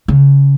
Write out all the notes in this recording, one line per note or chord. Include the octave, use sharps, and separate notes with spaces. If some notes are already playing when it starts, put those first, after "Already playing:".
C#3